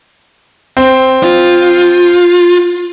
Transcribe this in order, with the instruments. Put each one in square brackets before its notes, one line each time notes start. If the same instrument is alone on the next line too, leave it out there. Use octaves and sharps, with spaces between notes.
[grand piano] C4
[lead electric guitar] F4